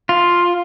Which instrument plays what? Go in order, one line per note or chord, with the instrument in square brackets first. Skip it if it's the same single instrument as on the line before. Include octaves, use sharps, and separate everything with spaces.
[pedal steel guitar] F4